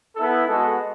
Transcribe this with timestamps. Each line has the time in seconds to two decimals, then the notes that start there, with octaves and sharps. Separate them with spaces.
0.16 B3 E4 A4
0.46 G#3 B3 F#4 A4